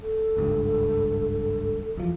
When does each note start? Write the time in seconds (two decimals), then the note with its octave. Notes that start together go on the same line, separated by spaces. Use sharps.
0.03 A4
0.37 G#1 C#2 G2
1.97 E2 F3